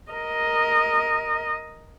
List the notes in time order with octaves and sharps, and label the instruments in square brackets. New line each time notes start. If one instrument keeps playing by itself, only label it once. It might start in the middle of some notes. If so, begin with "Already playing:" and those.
[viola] A#4 D#5